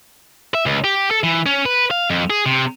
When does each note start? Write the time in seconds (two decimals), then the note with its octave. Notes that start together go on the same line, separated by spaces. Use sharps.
0.55 E5
0.66 C#2
0.84 G4
1.11 A4
1.24 E3
1.46 C#4
1.66 B4
1.91 F5
2.10 F2
2.30 G#4
2.46 C3